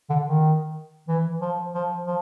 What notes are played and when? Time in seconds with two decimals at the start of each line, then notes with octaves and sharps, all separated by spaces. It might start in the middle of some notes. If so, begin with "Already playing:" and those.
0.10 D3
0.26 D#3
1.08 E3
1.41 F3
1.74 F3
2.07 F3